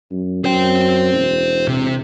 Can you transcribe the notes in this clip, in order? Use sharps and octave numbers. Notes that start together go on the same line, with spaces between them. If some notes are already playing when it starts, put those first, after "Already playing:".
F#2
F#2 C5 G5
E1
C3